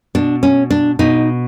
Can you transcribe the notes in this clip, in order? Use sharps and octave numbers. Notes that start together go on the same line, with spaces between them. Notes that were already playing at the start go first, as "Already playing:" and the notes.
B2 D4
C#4
D4
B2 D#4